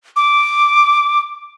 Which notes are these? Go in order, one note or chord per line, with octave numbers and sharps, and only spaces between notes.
D6